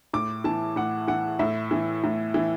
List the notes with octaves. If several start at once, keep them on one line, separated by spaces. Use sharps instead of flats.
A2 D6
E3 A5
A2 F#5
E3 F#5
A2 E5
E3
A2
E3